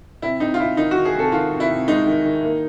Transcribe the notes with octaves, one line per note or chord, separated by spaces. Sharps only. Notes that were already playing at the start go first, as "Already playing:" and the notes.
C3 E4
C3 D#4
F4
C3 E4
D#3 D#4
F#4
D#3
G#4
C3 A4
D#3 F4
C3
E4
C3
G#3 D#4
D#3
D#3
A#3